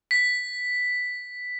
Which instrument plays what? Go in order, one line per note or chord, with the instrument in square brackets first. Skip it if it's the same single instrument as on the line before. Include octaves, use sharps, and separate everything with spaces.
[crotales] B6